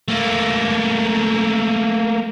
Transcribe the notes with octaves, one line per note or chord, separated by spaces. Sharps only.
A3 A#3